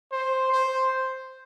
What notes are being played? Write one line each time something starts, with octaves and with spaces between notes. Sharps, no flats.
C5
C5